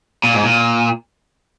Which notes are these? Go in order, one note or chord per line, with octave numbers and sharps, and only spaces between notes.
A#2
G#2
A#2